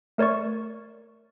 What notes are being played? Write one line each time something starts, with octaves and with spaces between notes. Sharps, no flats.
A3 A#4 C#5 D5 C#6